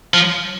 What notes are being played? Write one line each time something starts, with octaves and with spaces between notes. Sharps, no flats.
F3